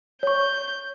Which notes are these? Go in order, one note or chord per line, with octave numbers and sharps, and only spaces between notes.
C#5 C#6 G6